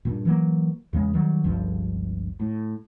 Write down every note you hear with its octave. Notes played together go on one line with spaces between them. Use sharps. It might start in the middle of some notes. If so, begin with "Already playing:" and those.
G2 A#2
E3 F#3 A#3
E2 C#3 G#3
D#3 F#3 G3
G1 C#2 G2 F3
A2